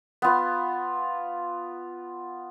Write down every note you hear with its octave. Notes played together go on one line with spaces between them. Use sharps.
B3 F4